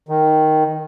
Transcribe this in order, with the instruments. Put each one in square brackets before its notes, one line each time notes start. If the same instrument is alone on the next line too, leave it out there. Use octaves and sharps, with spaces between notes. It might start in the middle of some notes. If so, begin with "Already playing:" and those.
[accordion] D#3